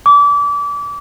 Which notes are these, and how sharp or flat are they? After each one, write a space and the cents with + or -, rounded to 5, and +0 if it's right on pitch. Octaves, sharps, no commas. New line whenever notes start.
D6 -30